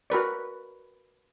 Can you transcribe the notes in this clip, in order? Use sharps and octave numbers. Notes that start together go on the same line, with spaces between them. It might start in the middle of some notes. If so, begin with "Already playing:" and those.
F#4 A#4 B4 D5